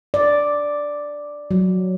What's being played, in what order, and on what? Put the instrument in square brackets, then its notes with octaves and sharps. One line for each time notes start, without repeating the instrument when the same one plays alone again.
[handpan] D5
F#3